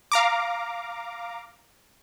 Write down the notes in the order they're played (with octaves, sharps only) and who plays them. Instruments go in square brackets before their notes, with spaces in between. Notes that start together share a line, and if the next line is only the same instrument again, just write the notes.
[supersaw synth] F5 A#5 D6